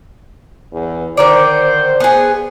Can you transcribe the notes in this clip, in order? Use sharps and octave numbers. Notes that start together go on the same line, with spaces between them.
E2
D3 D#3 C5 D5
B3 G#4